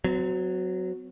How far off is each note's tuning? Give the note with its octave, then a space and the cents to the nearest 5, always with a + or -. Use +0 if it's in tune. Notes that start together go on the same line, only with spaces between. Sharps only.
F#3 +0 C4 -40